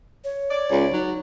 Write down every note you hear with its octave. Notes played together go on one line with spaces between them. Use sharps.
C#5
D5
C#2
F#3 D#4